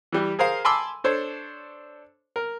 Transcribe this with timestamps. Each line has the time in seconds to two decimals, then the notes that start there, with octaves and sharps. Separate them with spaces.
0.12 E3 G3 G4
0.39 G#4 A#4 C5 F5
0.65 G#5 A5 B5 C6 D6 E6
1.04 D4 A4 C5 C#5
2.36 A#4